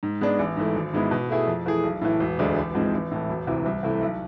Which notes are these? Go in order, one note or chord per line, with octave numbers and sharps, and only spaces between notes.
G#2
G#3 B3 D4
A1
G#2 E3 A3
G#1
G#2 G#3 B3 E4
B2
A3 E4 G#4
F2
E3 A3 E4 G#4
B1
A2 E3
E1
D2 D3 G#3 D4
A1
G#2 F3 G#3 C4
A1
A2 E3
E1
D2 C3 E3
C2
C3 E3 A3 E4
B1